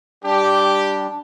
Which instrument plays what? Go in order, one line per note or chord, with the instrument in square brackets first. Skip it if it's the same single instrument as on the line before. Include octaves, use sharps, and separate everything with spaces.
[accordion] G3 D4 [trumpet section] G4